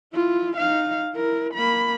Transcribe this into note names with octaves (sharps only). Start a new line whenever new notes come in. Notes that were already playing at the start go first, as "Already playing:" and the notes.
E4 F4
D#4 F5
E4 A#4
A#3 B5